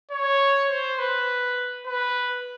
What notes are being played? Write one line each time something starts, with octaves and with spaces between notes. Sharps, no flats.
C#5
C5
B4
B4